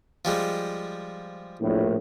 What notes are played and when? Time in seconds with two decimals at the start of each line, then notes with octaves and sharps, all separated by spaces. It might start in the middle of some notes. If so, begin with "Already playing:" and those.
0.25 F3 G3 G#3
1.61 A#1 A2